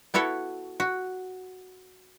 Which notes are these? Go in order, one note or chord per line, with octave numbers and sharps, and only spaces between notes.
B3 E4 F#4 A4 C#5
F#4